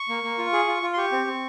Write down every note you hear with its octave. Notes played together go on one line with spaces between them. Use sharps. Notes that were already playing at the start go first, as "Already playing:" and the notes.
Already playing: C#6
A#3
A#3
F4
G#4
F4
F4
C6
G4 C#6
C4
C4